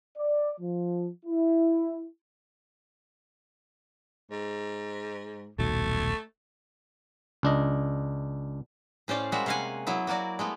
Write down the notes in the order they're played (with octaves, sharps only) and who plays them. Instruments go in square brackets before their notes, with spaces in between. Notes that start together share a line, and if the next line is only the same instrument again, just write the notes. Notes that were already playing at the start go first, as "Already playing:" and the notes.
[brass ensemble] D5
F3
E4
[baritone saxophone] G#2
[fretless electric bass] D#1 B1 F#3 [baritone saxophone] A3
[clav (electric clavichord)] C#2 D4 D#5
[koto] A2 C#4 C5 D5 F5
G3 G#3 A#3 F#4 E5
C3 C#4 F5 F#5 G#5
F#3 B3 E4
A#3 F#4 A#4 D5
G#3 A3 B3